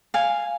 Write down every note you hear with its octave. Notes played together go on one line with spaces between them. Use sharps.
F5 G#5